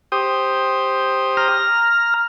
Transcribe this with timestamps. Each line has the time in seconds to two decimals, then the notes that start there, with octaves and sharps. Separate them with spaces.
0.12 G4 C5 D#6
1.37 A#5 F6